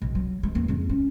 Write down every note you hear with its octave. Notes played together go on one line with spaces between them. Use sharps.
B1
F#3
G#3
D#2 B3
F2 G#2
C#4